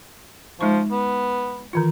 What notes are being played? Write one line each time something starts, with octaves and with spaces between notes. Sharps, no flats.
F3 G#3 D#4 C#6
B3
D#3 E3 F4